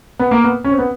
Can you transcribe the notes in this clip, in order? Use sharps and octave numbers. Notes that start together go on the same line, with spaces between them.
B3
A#3
B3
C#4
C4
B3